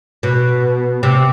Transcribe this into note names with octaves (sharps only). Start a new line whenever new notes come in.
B2
C3